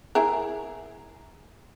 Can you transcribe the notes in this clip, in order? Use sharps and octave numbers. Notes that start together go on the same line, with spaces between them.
E4 G#4 A#4